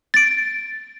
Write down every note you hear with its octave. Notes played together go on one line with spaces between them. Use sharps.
A6 D7